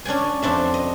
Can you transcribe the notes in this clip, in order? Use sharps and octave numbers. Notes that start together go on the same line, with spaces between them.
C#4 D4 G5 G#5
F2 C4 D4 E5
D#5